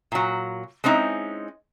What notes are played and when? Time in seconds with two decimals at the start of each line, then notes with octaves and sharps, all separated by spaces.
0.12 A#2 F#3
0.84 G#3 C4 C#4 D#4 E4